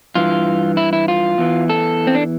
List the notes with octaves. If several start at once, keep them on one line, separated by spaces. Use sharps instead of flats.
G2 E3 F4
E4
E4
F4
E2 E3
A4
C4
D4